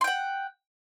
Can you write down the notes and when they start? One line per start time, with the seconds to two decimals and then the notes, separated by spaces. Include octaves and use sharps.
0.01 C6
0.04 G5
0.07 F#5